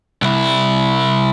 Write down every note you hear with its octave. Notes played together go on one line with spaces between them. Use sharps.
C2 E4